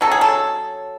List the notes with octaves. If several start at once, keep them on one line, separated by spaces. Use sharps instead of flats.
F#3 C#4 A4
G#4
A4